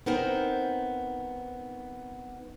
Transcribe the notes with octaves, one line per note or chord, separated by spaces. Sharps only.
B3 C4 D#4 A#4 C5